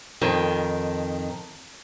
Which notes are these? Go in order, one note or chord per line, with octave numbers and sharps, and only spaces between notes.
F2 D#3